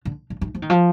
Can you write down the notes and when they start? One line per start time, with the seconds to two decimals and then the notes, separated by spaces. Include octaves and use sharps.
0.05 D3
0.30 D3
0.41 D#3
0.55 F3
0.62 D#3
0.70 F3